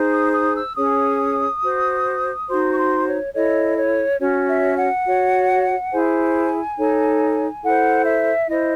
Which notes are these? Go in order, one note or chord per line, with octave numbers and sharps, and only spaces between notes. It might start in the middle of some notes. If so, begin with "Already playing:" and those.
Already playing: D#4 G#4 C5
D#6
D#6
E6
C#4 G#4 C#5 D#6
F#4 C5
D#4 F#4 C5 C6
C#6
C6
C#5
E4 A4 C#5 D#5
C#5
C#4 F#4 C#5
E5
F#5
F#4 C#5
E4 G#4 C5 G#5
D#4 A4 C#5
E4 A4 C5 F#5
E5
E4 C5 D#5